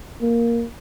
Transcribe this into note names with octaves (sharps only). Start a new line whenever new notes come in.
A#3